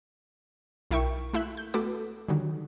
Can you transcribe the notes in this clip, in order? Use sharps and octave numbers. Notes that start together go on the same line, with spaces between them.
B1 E4 A#4 E5 G5 C#6
A3 E4 E5 F#6
G6
A3 B3 F#4 A4 B4 D6
D3 D#3 F#3 G3